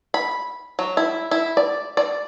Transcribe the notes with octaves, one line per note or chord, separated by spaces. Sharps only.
B5
F#3
E4
E4
D5
D5